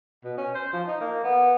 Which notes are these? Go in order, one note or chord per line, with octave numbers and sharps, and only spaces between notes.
B2
C#4
C5
F3
D#4
A#3
B3